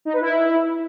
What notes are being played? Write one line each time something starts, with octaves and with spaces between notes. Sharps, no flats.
D#4
B4
E4